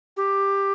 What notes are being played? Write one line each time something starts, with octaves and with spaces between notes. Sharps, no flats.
G4